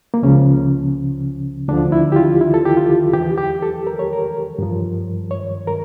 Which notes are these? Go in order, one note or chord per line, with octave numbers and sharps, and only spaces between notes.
A#3
C#2 C#3 F3 C#4
D2 D3 F3 D4
E4
G4
F4
E4
A4
G4
F4
E2 E3 G4
G4
A4
A#4
C#5
A#4
G2 F3
C#5
A#4